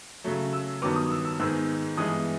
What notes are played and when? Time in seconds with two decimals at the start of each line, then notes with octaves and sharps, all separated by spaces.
0.24 C#3 F#3 A3
0.53 E6
0.82 G2 D#3 F#3 B3 D6
0.96 D#6
1.11 E6
1.25 E6
1.39 G#2 D#3 G#3 B3 E6
1.97 G2 E3 G#3 B3 D#6